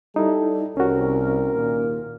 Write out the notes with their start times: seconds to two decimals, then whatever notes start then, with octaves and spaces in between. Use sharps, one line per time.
0.16 G3 D#4 E4 A4
0.77 C2 C#4 F#4 A#4
1.54 D#2 A#2